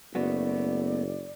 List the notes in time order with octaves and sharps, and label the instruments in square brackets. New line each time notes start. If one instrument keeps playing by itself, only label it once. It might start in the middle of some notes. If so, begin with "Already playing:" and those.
[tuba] F#1 [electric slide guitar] A3 B3 F#4 [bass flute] D5